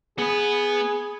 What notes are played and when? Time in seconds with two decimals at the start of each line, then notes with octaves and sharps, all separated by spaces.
0.18 B3 G#4 B4